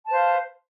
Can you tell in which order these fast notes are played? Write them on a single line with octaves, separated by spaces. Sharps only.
A5 B4 C5 F5